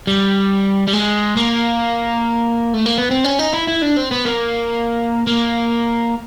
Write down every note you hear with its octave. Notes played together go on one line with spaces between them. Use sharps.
G3
G3
G#3
A#3
A3
A#3
B3
C4
C#4
D#4
E4
E4
D4
C4
B3
A#3
A#3